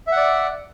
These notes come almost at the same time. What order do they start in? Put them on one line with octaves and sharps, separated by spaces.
E5 F#5 D5